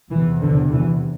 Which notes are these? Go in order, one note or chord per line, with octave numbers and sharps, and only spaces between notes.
E2 C3 E3
D3
E3